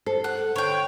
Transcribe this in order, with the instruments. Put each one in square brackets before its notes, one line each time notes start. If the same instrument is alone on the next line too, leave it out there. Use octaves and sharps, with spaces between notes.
[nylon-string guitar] A4 [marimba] C5
[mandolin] F#5
[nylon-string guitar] D3 [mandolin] C#5 G5